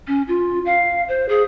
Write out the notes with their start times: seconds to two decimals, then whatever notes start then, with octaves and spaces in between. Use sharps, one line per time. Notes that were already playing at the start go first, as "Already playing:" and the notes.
0.08 C#4
0.28 F4
0.66 F5
1.08 C5
1.29 G#4